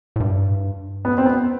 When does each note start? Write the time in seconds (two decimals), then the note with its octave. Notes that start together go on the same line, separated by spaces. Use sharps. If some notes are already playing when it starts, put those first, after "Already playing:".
0.16 A2
0.20 G2
1.05 B3
1.18 C4
1.26 B3